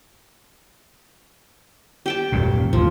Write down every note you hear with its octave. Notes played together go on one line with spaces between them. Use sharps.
G4 G5 A5
D#1 F#2 A#2
A1 D#2 C3 F3